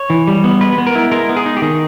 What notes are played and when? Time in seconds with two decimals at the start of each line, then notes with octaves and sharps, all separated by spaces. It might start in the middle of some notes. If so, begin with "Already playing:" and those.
Already playing: C#5
0.10 E3
0.28 G3
0.44 B3
0.61 G#3 B4
0.78 B3
0.87 A#4
0.95 E4
1.12 G#3 A#4
1.29 B3
1.37 G#4
1.46 D#4
1.57 G4
1.62 D#3 G#4